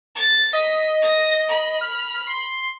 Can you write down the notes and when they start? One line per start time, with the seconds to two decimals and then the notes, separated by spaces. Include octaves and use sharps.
0.15 A6
0.53 D#5 B6
1.02 A#6
1.49 B5
1.81 F6
2.27 C6